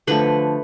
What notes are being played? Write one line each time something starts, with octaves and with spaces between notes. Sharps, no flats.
D3 F3 A3 B4